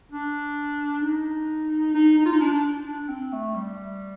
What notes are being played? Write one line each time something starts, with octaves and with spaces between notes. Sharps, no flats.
D4
D#4
D#4
D#4
F4
D#4
D4
D4
C4
A3
G3